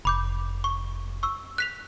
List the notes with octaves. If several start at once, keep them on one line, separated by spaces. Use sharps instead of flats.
F1 B5 D6 G6
C#6
C#6 E6
F#6 B6 F7